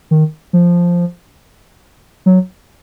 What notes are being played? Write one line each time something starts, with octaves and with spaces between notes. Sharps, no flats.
D#3
F3
F#3